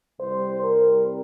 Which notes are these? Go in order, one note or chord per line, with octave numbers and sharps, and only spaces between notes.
C2 C3 G3 C5
A#4